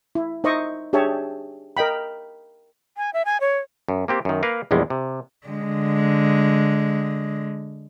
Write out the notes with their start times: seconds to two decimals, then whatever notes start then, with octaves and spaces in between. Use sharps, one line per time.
0.15 E4
0.44 D#4 C5 D#5 E5 C#6 D6
0.93 D4 G4 G#4 C#5 E5 A5
1.77 A#4 D#5 G5 B5
2.97 G#5
3.13 E5
3.25 G#5
3.41 C#5
3.89 F#2
4.08 A#3 C4 G4
4.25 F#2 D#3
4.43 A#3 A#4 B4 F5
4.71 A#1 E2 G3 G#3
4.90 C3
5.47 D3 G#3